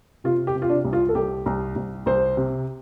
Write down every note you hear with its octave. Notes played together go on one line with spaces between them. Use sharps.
C3 F4
G4
C3
F4
D4
C2
F4
A4
C2 G4
C2
C2
C2 C5
C3